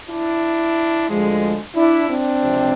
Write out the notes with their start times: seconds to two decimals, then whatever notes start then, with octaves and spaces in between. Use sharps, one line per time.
0.09 D4 E4
1.08 D2 D3 F3 G#3
1.75 D4 E4
2.08 C4 D4
2.41 C#2 C3 F3